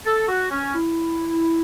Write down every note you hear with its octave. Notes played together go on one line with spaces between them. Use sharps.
A4
F#4
C#4
E4